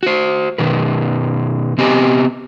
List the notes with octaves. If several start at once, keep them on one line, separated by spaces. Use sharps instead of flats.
F#4 C5
B2 D#3 B4
C3 B3 C4 G4 D#5 G#5